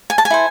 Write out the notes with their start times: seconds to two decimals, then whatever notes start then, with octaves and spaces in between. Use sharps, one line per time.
0.10 G#5
0.18 A5
0.25 G#5
0.30 E4 A4 C5